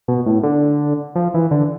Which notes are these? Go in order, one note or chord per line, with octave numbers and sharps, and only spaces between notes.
B2
A2
D3
F3
E3
D3